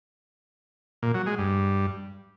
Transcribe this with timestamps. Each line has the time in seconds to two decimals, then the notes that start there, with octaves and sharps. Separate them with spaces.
1.03 A#2
1.15 F#3
1.26 G#3
1.38 G2